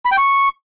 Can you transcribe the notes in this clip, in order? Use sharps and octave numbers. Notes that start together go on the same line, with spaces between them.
B5
G5
C#6